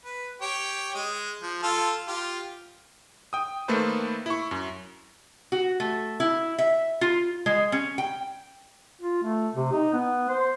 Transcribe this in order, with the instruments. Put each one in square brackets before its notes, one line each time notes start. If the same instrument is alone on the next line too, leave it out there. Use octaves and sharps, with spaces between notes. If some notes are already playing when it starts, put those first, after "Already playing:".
[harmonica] B4
G4 C#5 G5
G#3 D#5
F3
F4 A4
F4 G4
[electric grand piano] G5 D#6
D#3 A3 A#3 A4 B4 C5
E4 C#6
F#2
[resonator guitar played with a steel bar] F#4
A3
E4
E5
F4
G#3
C#4
G5
[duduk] F4
A3
C3
D#4
B3
C5